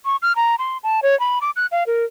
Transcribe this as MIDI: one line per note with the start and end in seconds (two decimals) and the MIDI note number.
0.05 0.16 85
0.22 0.32 89
0.36 0.55 82
0.59 0.78 84
0.83 1.00 81
1.03 1.18 73
1.20 1.39 83
1.41 1.50 86
1.56 1.66 90
1.71 1.84 77
1.87 2.05 70